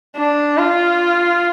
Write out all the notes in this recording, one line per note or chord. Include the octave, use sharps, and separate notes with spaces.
D4
F4